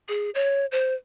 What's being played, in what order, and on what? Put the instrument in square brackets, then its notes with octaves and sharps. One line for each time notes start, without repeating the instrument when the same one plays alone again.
[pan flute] G#4
C#5
C5